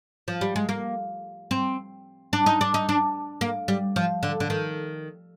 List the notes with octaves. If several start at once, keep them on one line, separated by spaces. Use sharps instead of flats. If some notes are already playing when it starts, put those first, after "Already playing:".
F3
G3
G#3
A#3
C4
D4
D#4
D4
D#4
D4
A#3
G3
F3
D3
D3
D#3